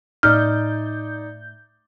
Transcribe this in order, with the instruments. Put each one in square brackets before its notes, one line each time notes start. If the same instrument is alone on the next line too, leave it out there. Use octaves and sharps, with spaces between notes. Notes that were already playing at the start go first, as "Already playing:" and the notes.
[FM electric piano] A2 G6 [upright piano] D#4 D5 [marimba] F6